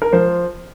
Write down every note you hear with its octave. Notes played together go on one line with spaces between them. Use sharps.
A#4
F3 C5